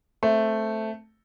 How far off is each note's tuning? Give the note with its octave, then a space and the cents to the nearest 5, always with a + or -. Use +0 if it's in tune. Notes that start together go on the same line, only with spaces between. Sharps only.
A3 +0 C4 +0